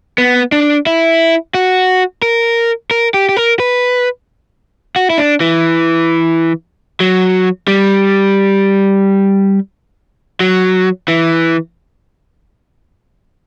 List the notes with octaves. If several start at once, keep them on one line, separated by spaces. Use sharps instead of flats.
B3
D4
E4
F#4
A#4
A#4
G4
G4
A#4
B4
F#4
E4
D4
E3
F#3
G3
F#3
E3